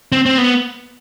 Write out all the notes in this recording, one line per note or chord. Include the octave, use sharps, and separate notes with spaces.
C4
C4
B3